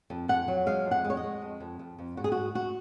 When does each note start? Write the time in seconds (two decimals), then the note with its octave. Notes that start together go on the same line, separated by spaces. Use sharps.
0.10 F2
0.28 F2 F#5
0.48 F#3
0.66 G#3 F5
0.85 F2
0.91 F#5
1.04 G#3
1.10 C#5
1.17 D#5
1.23 G#3
1.42 F2
1.60 F2
1.79 F2
1.99 F2
2.17 G#2 F#4
2.24 G#4
2.32 G#2 F#4
2.55 G#2 F#4